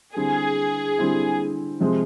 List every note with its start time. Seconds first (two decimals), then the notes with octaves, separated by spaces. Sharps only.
0.16 D3 G3 C4 E4 G#4
0.99 D3 G3 C4 E4
1.80 C3 F3 G#3 C4